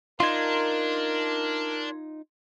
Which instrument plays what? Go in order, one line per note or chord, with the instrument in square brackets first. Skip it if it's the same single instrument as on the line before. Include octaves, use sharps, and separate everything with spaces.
[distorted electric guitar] D4 [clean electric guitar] D#4 F4 [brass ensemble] A#4 [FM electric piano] C6 G#6